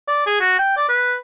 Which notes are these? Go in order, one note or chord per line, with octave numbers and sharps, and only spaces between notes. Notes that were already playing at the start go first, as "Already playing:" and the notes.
D5
G#4
F#4
G5
D5
B4